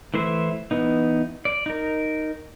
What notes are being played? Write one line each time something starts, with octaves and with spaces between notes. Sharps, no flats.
E3 A3 E4 C5 E5
E3 B3 D#4
D5
D#4 A#4